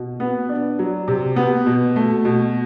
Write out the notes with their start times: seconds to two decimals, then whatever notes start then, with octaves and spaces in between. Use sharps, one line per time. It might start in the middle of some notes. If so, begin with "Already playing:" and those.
Already playing: B2
0.20 B3
0.49 D4
0.79 F#3
1.08 C3
1.36 B3
1.66 B2
1.96 A3
2.25 B2